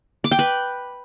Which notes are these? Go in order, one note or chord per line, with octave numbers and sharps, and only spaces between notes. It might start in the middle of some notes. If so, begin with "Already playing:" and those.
D6
G5
B4